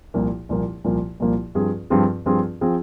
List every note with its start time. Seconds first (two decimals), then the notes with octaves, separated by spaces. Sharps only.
0.14 C2 A#2 F3 A#3
0.49 C2 A#2 F3 A#3
0.84 C2 A#2 F3 A#3
1.20 C2 A#2 F3 A#3
1.55 G2 F3 C4 F4 G#4
1.90 G2 F3 C4 F4 G#4
2.26 G2 F3 C4 F4 G#4
2.61 F3 C4 F4 G#4